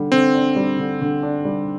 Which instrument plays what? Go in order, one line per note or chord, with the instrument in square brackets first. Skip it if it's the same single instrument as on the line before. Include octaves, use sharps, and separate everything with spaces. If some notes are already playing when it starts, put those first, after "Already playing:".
Already playing: [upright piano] D3 G3 D4
[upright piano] D3 [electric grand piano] C4
[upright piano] D4
G3
D3
D3
D4
G3